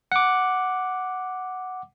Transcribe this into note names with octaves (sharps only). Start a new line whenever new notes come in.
F#5 D6